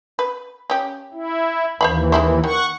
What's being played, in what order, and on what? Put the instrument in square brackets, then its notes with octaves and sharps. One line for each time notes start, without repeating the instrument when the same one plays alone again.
[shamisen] B4
C#4 G4
[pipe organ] E4
[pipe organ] D#2 E3 [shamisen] C5 F5 B5
[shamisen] G#3 E4 C5
[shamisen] D#3 [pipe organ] F#5 C#6